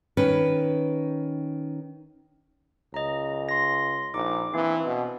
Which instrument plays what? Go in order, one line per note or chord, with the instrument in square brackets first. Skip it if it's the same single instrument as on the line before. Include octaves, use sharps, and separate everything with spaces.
[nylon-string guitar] D#3 C#4 B4
[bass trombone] C#2 [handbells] D#5 A#5
[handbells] C6 A#6
[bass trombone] A#1 [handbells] D#4 D6
[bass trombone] E3 [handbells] A#3 C4 D4
[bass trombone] B2